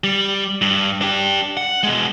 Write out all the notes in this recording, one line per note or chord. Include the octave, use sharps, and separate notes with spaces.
G3
G2
D4 G4
F#5
B2 G#3